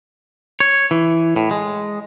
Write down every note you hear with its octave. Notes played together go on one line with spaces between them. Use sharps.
C#5
E3
A2
G#3